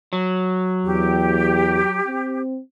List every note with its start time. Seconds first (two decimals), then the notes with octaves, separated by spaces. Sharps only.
0.13 F#3
0.85 E2 G4
2.07 C4